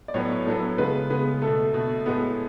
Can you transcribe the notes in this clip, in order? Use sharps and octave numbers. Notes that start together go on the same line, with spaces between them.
D5
A2 F#3 B3 C#5
A2 F#3 B3 A4
C#3 G#3 B3 B4
C#3 G#3 B3
B2 A3 A4
B2 A3
A2 G#3 B3